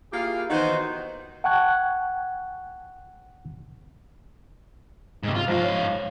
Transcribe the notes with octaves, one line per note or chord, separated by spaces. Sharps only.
A#3 E4 F4 G4 G#4 F5
D#3 E3 B3 D#4 F#4 C5
F#5 G5 A5 C#6 F#6 G#6
G#2 C3
F4
G#2 F3 F5 A#6
C#5